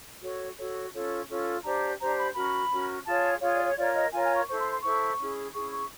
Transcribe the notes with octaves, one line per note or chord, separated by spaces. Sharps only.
F#4 A4 C#5
F#4 A4 C#5
C#4 F4 A4 C#5
C#4 F4 A4 C#5
D4 G4 C5 A#5
D4 G4 C5 A#5
B5
C#4 F#4 A#4 B5
C#4 F#4 A#4
F4 G#4 C#5 A5
F4 G#4 C#5 F5
D5
C#5
F4 A#4 C#5 D5
D#5
F4 A#4 C#5 G#5
G#5
C#6
E4 A4 C5 C#6
C6
C6
E4 A4 C5 C#6
C#4 E4 G#4
C#4 E4 G#4 C#6
C#6